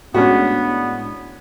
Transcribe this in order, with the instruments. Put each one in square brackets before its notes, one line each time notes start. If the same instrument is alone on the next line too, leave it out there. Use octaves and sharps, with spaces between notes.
[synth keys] A2 G#3 D4 [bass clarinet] B3 [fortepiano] C#4 F#4